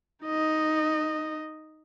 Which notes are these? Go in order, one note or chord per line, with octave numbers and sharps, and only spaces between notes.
D#4 D#5